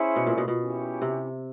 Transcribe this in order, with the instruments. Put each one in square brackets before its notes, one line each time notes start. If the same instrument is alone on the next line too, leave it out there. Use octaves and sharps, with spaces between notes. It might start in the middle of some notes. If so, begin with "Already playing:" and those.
Already playing: [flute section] C#4 E4 G#4 C5
[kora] B2
A#2
B2
B2
[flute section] C#4 E4 G4
[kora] C3